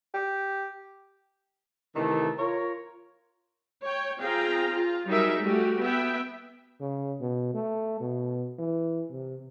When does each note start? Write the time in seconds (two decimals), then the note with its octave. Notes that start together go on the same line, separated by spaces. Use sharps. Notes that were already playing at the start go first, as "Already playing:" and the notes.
0.14 G4
1.95 C3 D#3 E3 A3
2.38 F4 A#4 C#5
3.83 C#5 G5
4.18 C4 F4 G#4 F5 G5 A#5
4.72 F4
5.07 F#3 G3 D#4 G#4 A#4 E5
5.42 G3 A3 F#4 G4
5.81 B3 E5 G5
6.80 C#3
7.20 B2
7.54 A3
8.00 B2
8.59 E3
9.10 C3